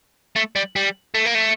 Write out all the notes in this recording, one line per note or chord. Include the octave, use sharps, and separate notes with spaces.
A3
G3
G3
A3
A#3
A3